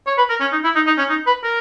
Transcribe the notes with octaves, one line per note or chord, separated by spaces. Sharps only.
C#5
B4
A#4
C#4
D#4
E4
D#4
D#4
C#4
D#4
B4
A#4